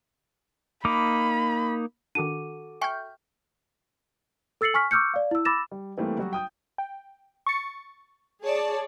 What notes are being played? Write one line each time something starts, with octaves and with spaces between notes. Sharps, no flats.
A#3 D#4 B5 D6
D#3 D4 F#4 A4 D6 D#7
E5 G5 G#5 C#6 F6 G6
A4 E6 A6 C7 C#7 F#7
G#5 C#6 F6 B6
C#6 D6 E6 F6 G6 C#7
D5 F5
E4 E6
B5 D6 E6 A6 A#6 E7
G3
E3 G3 A3 A#3 C4
F#3 G3 F#4
G5 D#6 G6
G5
C#6 A6 C#7
G#4 C#5 D5 A5